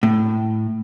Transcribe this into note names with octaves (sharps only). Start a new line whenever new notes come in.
A2